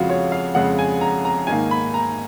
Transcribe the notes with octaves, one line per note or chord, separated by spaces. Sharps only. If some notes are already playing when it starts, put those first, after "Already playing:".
Already playing: F2 C#3 G#3 F4 F#4
C#5
F5
F2 C#3 G#3 F#5
G#5
A#5
A#5
G#2 D#3 A#3 G#5
B5
A#5